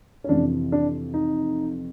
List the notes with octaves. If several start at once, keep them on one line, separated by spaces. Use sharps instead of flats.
C#4
F2 C3 E3 D4
D4
D#4